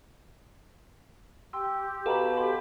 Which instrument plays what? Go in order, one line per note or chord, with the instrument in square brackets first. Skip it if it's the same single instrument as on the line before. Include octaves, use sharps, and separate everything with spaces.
[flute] G4 [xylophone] G5 C6 E6
[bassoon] B2 [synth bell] A4 [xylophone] F5 A#5 B5
[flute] G4 [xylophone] B5 C6